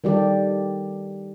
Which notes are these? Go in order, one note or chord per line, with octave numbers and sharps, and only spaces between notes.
D#3 G3 G4 A4 D5